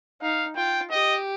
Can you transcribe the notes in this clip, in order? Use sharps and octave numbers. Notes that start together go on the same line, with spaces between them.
D#4 F5
F4 G5
G4 D#5